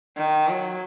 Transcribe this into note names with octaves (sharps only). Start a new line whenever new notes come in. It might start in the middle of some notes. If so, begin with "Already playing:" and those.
D#3
F#3